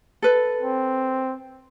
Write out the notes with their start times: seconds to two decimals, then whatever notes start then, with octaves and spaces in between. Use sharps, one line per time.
0.22 A4 B4
0.62 C4